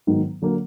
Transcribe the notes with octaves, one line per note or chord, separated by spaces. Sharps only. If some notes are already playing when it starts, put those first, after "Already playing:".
G#2 D#3 F#3 B3
D3 F#3 A#3